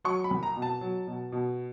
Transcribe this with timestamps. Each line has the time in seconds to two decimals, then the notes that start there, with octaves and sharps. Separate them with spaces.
0.05 F#3 C#6
0.24 B5
0.31 C2
0.43 A#5
0.56 B2
0.62 A5
0.81 F#3
1.07 B2
1.32 B2